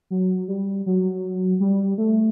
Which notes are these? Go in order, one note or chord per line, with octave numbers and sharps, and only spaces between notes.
F#3
G3
F#3
G3
A3